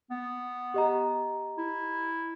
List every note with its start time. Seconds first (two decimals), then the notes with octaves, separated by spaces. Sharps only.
0.11 B3
0.74 G4 D#5 A#5
1.58 E4